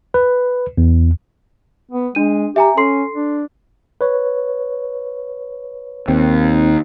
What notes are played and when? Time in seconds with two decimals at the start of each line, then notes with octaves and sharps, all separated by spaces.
0.14 B4
0.78 E2
1.91 B3
2.15 G#3 D4 D#7
2.56 G4 E5 G#5 A#5
2.77 C#4 A4 C6 C7
3.15 D4
4.01 B4 C#5
6.08 D#2 C4